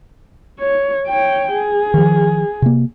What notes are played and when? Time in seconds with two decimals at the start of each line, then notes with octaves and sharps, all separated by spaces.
0.60 C#5
1.07 C#5 G5
1.53 G#4
1.94 D#3 F3
2.62 C3 A#3